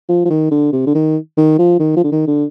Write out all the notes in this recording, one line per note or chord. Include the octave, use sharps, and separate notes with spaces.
F3
F3
D#3
D3
C3
D3
D#3
D#3
F3
D#3
F3
D3
D#3
D3